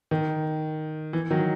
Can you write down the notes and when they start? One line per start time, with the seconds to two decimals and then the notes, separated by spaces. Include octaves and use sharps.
0.11 D#3
1.13 E3
1.30 D#3 F#3